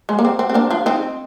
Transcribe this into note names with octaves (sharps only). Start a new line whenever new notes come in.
G#3
A#3
C4
C4
C4
A#3 D4
D4 F4
C4 D#4